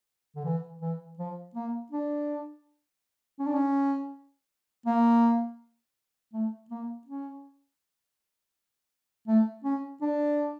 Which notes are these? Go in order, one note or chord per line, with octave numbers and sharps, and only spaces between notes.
D3
E3
E3
F3
A#3
D4
C#4
D4
C#4
A#3
A3
A#3
C#4
A3
C#4
D4